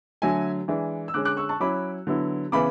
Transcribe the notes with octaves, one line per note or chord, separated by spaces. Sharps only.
D3 F#3 A3 E5 G#5
E3 G#3 D4
E6
D3 G#3 C#4 D6 F#6
D6 F#6
C#6 E6
A5 C#6
F#3 C#4 E4 B5 D6
D3 F#3 B3 E4
C#3 E3 B3 B5 D6